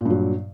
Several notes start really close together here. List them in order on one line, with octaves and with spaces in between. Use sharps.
A#2 G2 F#3